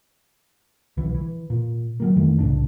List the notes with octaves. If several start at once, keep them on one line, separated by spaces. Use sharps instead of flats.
B1 E3
E3
A#2
F#3 G3 A#3
F2 D#3 E3 A3
C2 A2 C#3 D4